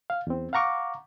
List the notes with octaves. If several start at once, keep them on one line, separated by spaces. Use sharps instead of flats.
F5
E2 C4
F5 F#5 A#5 C#6 D6